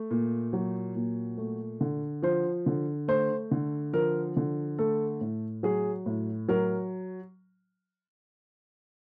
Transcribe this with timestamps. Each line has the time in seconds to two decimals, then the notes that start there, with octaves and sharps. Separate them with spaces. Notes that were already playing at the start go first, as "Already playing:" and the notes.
Already playing: A3
0.11 A#2
0.53 F#3
0.96 A#2
1.38 A3
1.81 D3
2.22 F3 C5
2.66 D3
3.08 A3 C5
3.51 D3
3.93 F3 A#4
4.37 D3
4.79 A3 A4
5.21 A2
5.63 F#3 G#4
6.06 A2
6.49 F#3 A#4